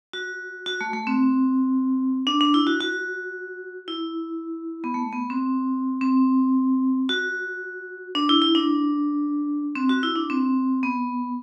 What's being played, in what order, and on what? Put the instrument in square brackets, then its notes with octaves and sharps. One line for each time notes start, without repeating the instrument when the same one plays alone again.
[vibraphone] F#4
F#4
A3
A3
C4
D4
D4
E4
F#4
F#4
E4
B3
A3
B3
C4
C4
F#4
D4
E4
E4
D4
C4
F#4
E4
D4
C4
B3